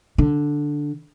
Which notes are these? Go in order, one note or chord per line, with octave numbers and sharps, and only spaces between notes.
D3